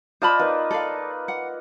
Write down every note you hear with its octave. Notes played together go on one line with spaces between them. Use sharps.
F4 C5 D5 D#5 A5 B5
A#3 D#4 B4
A4 D5 F5
F#5